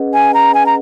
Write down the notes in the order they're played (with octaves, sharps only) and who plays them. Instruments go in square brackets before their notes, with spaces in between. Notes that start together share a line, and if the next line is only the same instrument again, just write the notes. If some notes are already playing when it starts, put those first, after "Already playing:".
Already playing: [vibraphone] C#4 G#4 B4 D#5 F#5
[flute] G#5
A#5
G#5
A#5